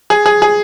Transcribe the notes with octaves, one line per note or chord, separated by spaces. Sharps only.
G#4
G#4
G#4